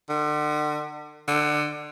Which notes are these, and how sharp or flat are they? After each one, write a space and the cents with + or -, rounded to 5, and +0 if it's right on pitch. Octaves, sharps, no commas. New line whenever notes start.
D3 +40
D3 +25